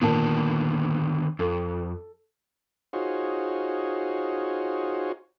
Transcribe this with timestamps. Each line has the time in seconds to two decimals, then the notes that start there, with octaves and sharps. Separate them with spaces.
0.01 A#2 D3 D#3 B3 A#4 A5
1.39 F2 A4
2.93 D#4 F4 F#4 G#4 C5 C#5